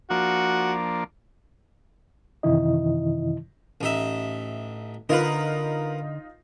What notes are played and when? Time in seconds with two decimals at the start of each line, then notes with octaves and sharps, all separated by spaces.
0.10 F3 A#3 D4 F#4
2.43 F#2 C3 D#3 E3 E4 D#5
3.81 A1 D#4 E5
5.09 D3 D#4 F4 A#4 B4